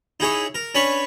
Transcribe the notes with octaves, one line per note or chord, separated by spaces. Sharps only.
D#4 E4 G#4 C#5
A#4
C#4 D4 B4 C#5 B5 C#6